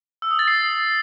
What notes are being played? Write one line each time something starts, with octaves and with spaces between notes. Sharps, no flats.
E6
D#6
A6
C7